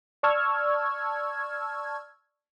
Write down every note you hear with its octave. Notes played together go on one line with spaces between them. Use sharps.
D5 A5 C#6 E6 F6 G#6